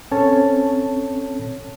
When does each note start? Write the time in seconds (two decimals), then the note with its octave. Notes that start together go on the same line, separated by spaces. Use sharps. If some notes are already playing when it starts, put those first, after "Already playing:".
0.11 C4 C#4 A4 C#5 A5